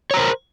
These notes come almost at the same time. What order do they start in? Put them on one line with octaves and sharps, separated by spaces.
C#5 A#5 C5 A#4